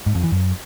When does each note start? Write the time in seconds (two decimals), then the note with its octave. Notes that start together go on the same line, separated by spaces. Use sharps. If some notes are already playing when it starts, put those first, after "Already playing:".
0.06 G#2
0.15 F2
0.24 E3
0.32 F#2